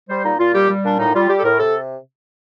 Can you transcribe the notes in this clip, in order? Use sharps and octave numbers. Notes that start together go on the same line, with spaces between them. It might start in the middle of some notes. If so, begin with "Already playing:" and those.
G3 C5
A#2 D#4
A#2 F4
G3 G4
G3
A#2 D4
A2 D#4
G3 F4
G3 G4
A4
A2 A#4
C3 A4